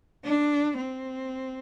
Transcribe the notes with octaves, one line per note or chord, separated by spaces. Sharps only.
D4
C4